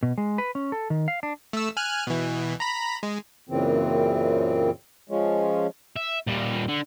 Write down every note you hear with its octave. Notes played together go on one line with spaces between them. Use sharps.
B2
G#3
B4
C#4
A4
D#3
F5
D4
A3 E6
G#5 F6 F#6
B2 E3
A#5 B5
G#3
F#2 A#2 C#3 E3 C4
F3 G#3 C#4
E5
A#2 G3
D3